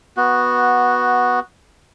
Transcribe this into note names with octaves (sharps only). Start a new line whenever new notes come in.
B3 F#4